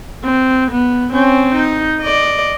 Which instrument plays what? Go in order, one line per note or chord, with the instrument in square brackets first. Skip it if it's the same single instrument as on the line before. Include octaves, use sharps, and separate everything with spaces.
[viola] C4
B3
C4 C#4
D#4
D5 D#5